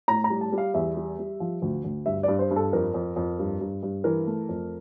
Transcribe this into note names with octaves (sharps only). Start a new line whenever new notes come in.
A2 A#5
A#5
G3
A5
G3
F5
E2 E5
G3
G3
F3
D2
D2
G2 E5
G2 D5
C5
G2
A4
F2 A#4
F2
F2
G2
G2
G2
E3 A#4
A3
F2